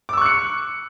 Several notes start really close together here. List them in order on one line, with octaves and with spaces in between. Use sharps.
D6 E6 C#6 F#6 C#7